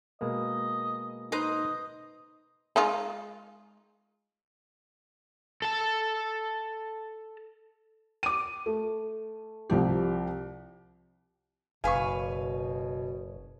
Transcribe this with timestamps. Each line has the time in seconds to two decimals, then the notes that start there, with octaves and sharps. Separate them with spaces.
0.21 B2 G#3 A#3 D#5
1.32 D#4 B4 C5 D#5 A#5
2.76 G#3 D#4 F4
5.62 A4 A5
8.23 D6 D#7
8.66 A3
9.70 C2 F3 G4
11.84 F#1 B2 B4 F5 G#5 C#6